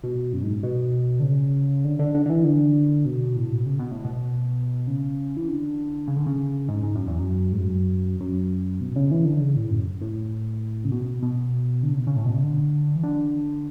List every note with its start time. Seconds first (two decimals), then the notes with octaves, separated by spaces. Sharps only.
0.03 B2
0.33 F#2
0.43 G#2
0.63 B2
1.20 D3
1.24 C#3
1.85 D3
1.99 D3
2.15 D3
2.26 D3
2.30 E3
2.45 D3
3.05 B2
3.36 A2
3.51 B2
3.66 C#3
3.79 B2
3.91 A2
4.05 B2
4.87 C#3
5.37 E3
5.48 D3
6.08 C#3
6.17 D3
6.26 C#3
6.68 G#2
6.83 G#2
6.95 F#2
7.07 E2
7.19 F#2
7.52 G#2
7.59 F#2
8.20 F#2
8.81 B2
8.96 C#3
9.11 E3
9.25 D3
9.40 C#3
9.56 A2
9.71 F#2
10.01 A2
10.84 C#3
10.92 B2
11.23 B2
11.83 D3
11.91 C#3
11.99 B2
12.07 C#3
12.16 A2
12.25 B2
12.35 C#3
12.43 D3
12.96 E3
13.03 D3